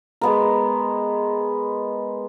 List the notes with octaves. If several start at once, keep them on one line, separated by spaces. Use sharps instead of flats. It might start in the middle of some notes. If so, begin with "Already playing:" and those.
G#3 B3 A#4